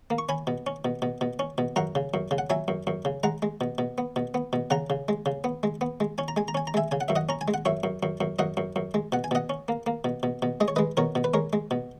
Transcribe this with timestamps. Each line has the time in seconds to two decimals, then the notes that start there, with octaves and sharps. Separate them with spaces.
0.10 A#3
0.18 C#6
0.29 C#4 G#5 B5
0.47 B2
0.67 C#4
0.85 B2
1.02 B2
1.21 B2
1.39 C#4
1.58 B2
1.76 F#2 F#5 A#5
1.95 C#3
2.14 F#2
2.31 C#3
2.38 F#5
2.50 F#3 E5 G#5
2.68 F#2
2.87 F#2
3.05 C#3
3.23 G#3 F#5 A#5
3.42 G#3
3.61 B2
3.78 B2
3.98 B3
4.16 B2
4.34 B3
4.53 B2
4.70 C#3 F#5 A#5
4.90 C#3
5.08 G#3
5.26 C#3
5.44 B3
5.63 G#3
5.81 B3
6.00 G#3
6.18 C#4 G#5
6.28 A#5
6.37 G#3 G#5
6.48 A#5
6.55 C#4 G#5
6.67 A#5
6.74 G#3 E5 G#5
6.91 C#3 G#5
7.01 F#5
7.08 F#2 E5
7.16 D#5 F#5
7.29 C#4 A#5
7.41 G#5
7.48 G#3
7.54 F#5
7.65 F#2 C#5 E5
7.84 F#2
8.03 F#2
8.21 F#2
8.39 F#2 D#5 F#5
8.57 F#2
8.76 F#2
8.94 G#3
9.12 B2 F#5
9.24 G#5
9.31 B2 D#5 F#5
9.50 C#4
9.68 A#3
9.87 A#3
10.04 B2
10.23 B2
10.42 B2
10.61 G#3 D#5
10.68 C#5
10.76 G#3 B4 D#5
10.97 B2 A#4 C#5
11.15 B2
11.24 B4
11.34 G#3 A#4 C#5
11.53 G#3
11.71 B2